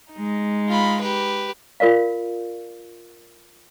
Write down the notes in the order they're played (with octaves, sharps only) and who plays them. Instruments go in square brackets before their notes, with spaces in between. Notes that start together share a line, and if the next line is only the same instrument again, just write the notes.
[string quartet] G#3 D#4
[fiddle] F4 B5
G4 B4
[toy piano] F4 A#4 D5 F5